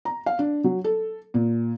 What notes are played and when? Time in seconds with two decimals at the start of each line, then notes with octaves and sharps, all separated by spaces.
0.05 A#5
0.26 F5
0.39 D4
0.64 F#3
0.84 A4
1.34 A#2